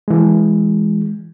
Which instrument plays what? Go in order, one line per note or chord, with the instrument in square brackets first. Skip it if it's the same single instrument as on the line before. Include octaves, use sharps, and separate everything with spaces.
[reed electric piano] E3 G#3